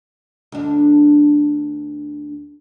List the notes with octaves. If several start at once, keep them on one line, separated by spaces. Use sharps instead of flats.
D2 D4